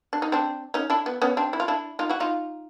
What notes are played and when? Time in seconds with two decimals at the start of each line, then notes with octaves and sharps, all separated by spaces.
0.13 D4
0.22 D#4
0.32 C4 D4
0.74 C#4 D#4
0.90 D4 E4
1.06 B3
1.22 B3 C#4
1.37 C4 D4
1.53 E4
1.60 F4
1.68 D4 E4
1.99 D#4 F4
2.09 E4 F#4
2.20 D#4 F4